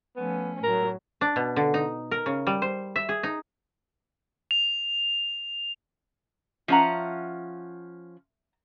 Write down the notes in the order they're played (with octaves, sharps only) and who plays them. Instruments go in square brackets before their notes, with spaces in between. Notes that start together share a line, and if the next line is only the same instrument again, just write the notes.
[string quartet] F3 A3 C#4 [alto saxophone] B3
[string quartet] A2 F#3 [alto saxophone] A#4
[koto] D4
B2
D3
D#4
A#4
C#3
G3
C5
E5
G#4
D#4
[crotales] F7
[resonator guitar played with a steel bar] F3 C#4 F#5 [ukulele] E5 A#5